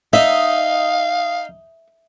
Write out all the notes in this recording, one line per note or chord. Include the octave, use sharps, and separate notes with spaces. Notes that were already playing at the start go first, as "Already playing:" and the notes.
D#4 E5 F5